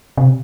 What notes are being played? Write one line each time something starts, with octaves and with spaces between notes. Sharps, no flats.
C3